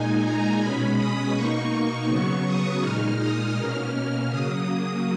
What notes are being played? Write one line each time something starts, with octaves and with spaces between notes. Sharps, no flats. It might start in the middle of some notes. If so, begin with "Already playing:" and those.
Already playing: A#2 G#3 D#4 G#5
A#5
B2 G#3 C#4 B5
D#6
B2 A#3 D#4 C#6
C#3 F#3 B3 C#6
D#6
A#2 G#3 D#4 F6
D#6
B2 A#3 C#4 F6
C#3 F#3 A#3 D#6
D#6